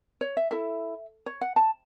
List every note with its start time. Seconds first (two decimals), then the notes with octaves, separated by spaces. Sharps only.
0.21 C#5
0.37 E5
0.51 E4 A4 E5
1.26 C#5
1.41 F#5
1.56 A5